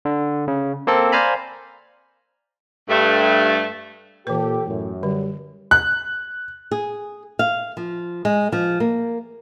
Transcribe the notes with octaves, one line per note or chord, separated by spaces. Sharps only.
D3
C#3
A#3 C4 A4
C5 D5 F5 G#5 A#5 B5
G2 A3
A#2 E3 G4 A4 B4
F#2 A2
D3 G3
F#6
G#4
F5
F3
G#3
F3
A#3